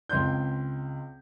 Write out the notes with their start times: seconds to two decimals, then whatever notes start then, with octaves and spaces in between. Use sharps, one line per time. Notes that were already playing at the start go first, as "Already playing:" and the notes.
0.09 C#2 C4 C6 G6